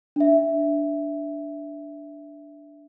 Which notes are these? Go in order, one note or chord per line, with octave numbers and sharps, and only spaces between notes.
D4 E5